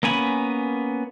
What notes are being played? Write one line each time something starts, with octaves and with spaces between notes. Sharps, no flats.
A#3 B3 C#4 G#5 B5